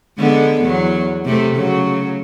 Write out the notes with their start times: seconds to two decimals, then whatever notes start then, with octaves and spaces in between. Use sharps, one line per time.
0.17 D3 G#3 B3
0.61 E2 F#3
1.25 C3 A3
1.55 C#3 F#3